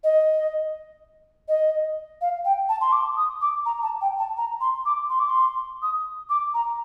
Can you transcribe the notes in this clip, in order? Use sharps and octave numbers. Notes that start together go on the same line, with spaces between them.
D#5
D#5
F5
G5
A5
C6
D6
D#6
D6
A#5
A5
G5
A5
A#5
C6
D6
C6
D6
C6
D#6
D6
A#5